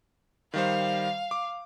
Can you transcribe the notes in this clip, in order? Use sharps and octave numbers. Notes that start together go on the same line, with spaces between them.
D#3 G3 C5 F5
D6